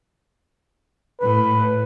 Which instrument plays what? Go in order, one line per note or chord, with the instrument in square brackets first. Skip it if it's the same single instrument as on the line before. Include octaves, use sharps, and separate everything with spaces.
[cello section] A2 [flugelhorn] B4